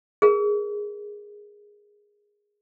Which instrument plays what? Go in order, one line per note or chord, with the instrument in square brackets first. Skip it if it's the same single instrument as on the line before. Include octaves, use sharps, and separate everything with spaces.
[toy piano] G#4 A#4